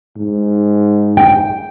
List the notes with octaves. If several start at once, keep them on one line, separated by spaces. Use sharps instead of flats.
G#2
G5